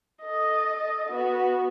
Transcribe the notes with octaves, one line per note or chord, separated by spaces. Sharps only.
A4 D#5
B3 F#4